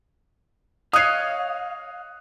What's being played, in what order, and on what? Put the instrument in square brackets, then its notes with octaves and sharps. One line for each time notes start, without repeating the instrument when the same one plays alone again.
[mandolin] C#5 D#5 [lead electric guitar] F5 [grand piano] D#6 F#6 C7